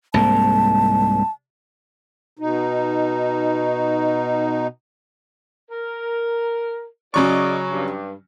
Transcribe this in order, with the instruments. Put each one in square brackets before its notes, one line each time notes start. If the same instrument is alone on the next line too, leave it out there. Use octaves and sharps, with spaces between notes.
[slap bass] C2 G#2 A#3 [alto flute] A5
[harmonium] B2 D#4
[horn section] A#4
[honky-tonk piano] C#3 F#3 C#6 [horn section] G#4 D5 D#5
[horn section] G2